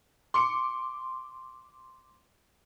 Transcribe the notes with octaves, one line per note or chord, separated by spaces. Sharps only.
C6 D6 C#7